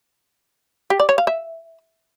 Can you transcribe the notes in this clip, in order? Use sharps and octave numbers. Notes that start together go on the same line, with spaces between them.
G4
D5
C#5
F5
E5